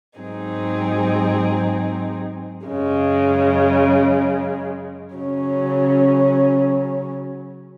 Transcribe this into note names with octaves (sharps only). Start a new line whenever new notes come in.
G#2 F#3 C4 D#4 G#4
F#2 C#3 G#3
C#3 F#3 C#4